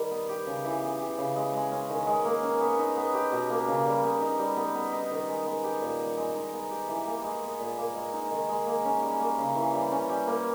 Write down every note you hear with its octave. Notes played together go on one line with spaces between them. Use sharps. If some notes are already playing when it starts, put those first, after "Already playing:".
Already playing: D#3 G3
B3
G4
C#3
E3
B3
G4
C#3
G#3
G#3
C#4
D#3
G#3
A#3
C#4
B3
D#4
B3
G4
B2
A#3
C#3
G3
B3
D#4
G3
B3
B3
D#4
D#3
G#3
B3
G4
A#2
G3
G#3
D#4
B3
G4
E3
A#3
G#3
B3
A#2
A#3
G#3
D#4
D#3
G#3
A#3
C#4
G3
A#3
C#3
E3
G3
C#4
G3
A#3